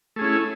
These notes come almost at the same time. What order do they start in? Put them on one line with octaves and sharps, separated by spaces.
A3 G#4 C#4 E4